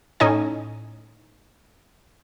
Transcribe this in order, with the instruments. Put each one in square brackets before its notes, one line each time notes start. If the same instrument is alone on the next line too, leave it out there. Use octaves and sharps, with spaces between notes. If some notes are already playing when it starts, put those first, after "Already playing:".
[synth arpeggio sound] A2 C#4 D#4 D#5 G#5